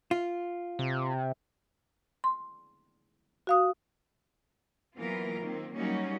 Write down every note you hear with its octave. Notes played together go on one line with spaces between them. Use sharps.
F4
C3
C6
F#4 F5 D#6
E3 F#3 A#3 B3 F4 A#4
D#3 A#3 C4
F#3 G3 A#3 C#4 D#4 F#4